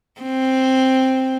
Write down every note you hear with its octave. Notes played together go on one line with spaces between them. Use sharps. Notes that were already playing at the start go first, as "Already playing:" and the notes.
C4